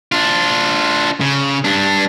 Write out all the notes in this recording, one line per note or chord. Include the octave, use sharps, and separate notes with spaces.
D4 F4
C#3
G2 D4